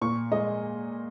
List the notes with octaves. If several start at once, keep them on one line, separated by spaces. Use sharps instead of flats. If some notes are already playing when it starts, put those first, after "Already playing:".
A#2 C#6
G#3 D#5